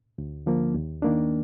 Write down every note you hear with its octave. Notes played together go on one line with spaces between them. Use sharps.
D2
D3 F3 A#3
D#2
D#3 A#3 D4